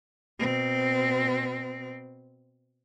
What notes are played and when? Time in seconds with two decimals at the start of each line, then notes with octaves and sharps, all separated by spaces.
0.39 B2 C4